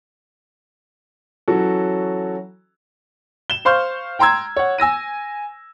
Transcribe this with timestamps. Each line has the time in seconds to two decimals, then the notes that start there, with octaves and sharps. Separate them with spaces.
1.48 E3 F#3 C#4 F#4 A4
3.50 E7 G7
3.65 C5 F5 C6 C#6 F6 G6
4.19 G5 A#5 C6 E6 G#6
4.57 C#5 F#5
4.78 G#5 E6 A#6 D#7